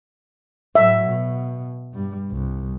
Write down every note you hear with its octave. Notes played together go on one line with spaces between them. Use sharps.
A2 F#3 E5
B2
G2 G3
C2